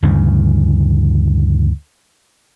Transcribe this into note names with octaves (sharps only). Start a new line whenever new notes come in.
D2 G2 C#3 E3